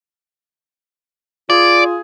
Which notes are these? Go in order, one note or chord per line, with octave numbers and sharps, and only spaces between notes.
F4 G#4 D5